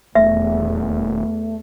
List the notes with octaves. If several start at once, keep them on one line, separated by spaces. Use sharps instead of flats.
D#1 E2 A3 E5